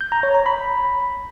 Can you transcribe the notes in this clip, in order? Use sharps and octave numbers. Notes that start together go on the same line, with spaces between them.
G6
A#5
C#5
A#5
B5